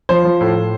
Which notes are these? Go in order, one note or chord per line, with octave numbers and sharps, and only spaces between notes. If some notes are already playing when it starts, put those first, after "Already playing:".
F3 C5
F3
A2
A2